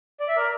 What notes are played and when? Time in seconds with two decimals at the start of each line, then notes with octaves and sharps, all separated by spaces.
0.20 D5
0.28 E5
0.36 A#4 D5